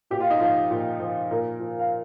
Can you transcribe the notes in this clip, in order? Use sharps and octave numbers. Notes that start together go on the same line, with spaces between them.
A#2 G4
F4
D#4
F3 F4
A#2
F3
A#2 A#4
F3
F5